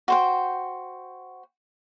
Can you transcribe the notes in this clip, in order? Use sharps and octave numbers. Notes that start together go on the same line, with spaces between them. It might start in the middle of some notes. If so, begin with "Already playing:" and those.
F#4 C5 G5